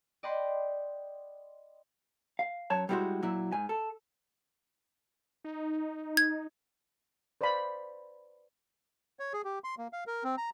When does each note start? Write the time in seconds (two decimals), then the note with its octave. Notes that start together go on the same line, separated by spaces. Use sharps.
0.23 D5 D#5 F#5 G5 B5 C6
2.39 F5
2.70 F#2 C#5 A5
2.89 G3 G#3 B3 E4 F#4 C5
3.23 A#2 F#3 E4
3.52 G#2 G#5
3.69 A4
5.44 D#4
6.17 G#6
7.41 B4 C5 D5 F5 B5
9.19 C#5
9.33 G#4
9.45 G4
9.64 C6
9.78 A#3
9.93 F5
10.07 A#4
10.24 C4
10.38 A#5